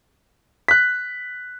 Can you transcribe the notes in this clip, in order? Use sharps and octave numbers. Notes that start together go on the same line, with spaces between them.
F#6 B6